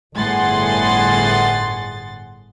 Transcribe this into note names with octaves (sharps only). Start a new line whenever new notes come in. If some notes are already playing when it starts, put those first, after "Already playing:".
G1 A2 G#4 F#5 C6 A6